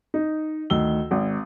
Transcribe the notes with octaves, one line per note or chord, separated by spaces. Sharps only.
D#4
D2 D#3 E6 G7
G#1